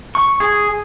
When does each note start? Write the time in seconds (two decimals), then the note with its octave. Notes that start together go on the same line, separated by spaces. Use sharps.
0.15 C#6
0.40 G#4